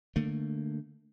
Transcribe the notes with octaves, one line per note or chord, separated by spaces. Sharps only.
D3 A3 A#3